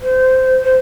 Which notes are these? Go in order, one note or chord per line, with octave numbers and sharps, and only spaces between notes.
C5
C5